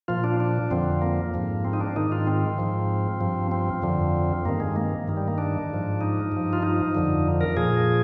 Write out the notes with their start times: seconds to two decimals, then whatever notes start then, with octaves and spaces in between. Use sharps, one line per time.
0.08 A#2 F3 F4
0.24 D4
0.40 D4
0.70 F2 D3 F3 C4
1.02 A#3
1.34 G#2 F3
1.65 C4
1.73 D#4
1.80 D4
1.96 G#2 D#3 D#4
2.12 F4
2.27 C4
2.58 G#2 F3
3.21 G2 F3
3.51 C4
3.82 F2 D3 F3
4.45 G2 D#3 A#3
4.60 G#3
4.76 A#3
5.08 G2 D#3
5.17 G3
5.28 A#3
5.38 D4
5.70 G#2 F3
6.01 D#4
6.32 G2 F3
6.53 F4
6.62 D#4
6.95 F2 D3 F3
7.41 A#4
7.57 A#2 F3 G#4